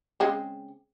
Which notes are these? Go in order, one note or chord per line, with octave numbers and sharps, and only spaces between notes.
C#3 G#3 C4